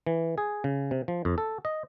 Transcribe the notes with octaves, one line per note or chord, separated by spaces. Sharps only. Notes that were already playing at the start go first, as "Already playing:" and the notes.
E3
G#4
C#3
C3
F3
F2
A4
D#5